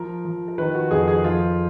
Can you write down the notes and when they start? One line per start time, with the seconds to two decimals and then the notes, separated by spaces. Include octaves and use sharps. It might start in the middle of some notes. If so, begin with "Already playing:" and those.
Already playing: F3 A#4
0.24 F3
0.48 A#4
0.58 D#3 B4
0.75 F#4
0.91 F2 G#4
1.08 G#4
1.24 F3 F4